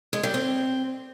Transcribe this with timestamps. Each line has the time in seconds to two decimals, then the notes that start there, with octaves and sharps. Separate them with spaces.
0.13 G#3
0.23 G3
0.34 C4